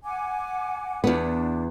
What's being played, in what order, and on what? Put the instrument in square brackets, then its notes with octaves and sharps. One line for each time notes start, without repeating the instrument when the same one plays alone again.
[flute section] F#5 G#5 D6
[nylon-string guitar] E2 B3 [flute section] D4